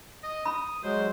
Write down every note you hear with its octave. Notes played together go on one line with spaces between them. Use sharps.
D#5
B5 D#6
F#3 G#3 C5